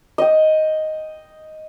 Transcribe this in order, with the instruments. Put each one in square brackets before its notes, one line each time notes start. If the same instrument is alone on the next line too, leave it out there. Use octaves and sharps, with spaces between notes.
[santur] D#5 G5